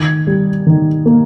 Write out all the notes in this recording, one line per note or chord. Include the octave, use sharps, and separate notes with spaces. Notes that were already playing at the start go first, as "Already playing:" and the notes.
Already playing: D#3 G#6
G3
D#3
A#3